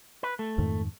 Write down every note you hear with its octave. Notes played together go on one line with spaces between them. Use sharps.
B4
A3
F2 G#2 D#3